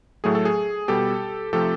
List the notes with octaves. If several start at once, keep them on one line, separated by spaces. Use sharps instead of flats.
A2 F#3 A3 G#4
A4
G#4
B2 G3 G4 A4
C3 F3 A3 G4 A4